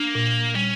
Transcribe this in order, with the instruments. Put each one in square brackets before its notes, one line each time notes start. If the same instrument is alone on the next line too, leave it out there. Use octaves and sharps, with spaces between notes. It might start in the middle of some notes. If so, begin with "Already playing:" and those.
Already playing: [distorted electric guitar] A#3 [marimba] D4
[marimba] A#2
[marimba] G3 [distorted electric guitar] C#4